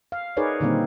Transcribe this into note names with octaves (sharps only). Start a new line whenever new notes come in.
F5
D#4 G#4 A#4 B4 C#5 D5
A#2 D3 D#3 G3 A#3 C4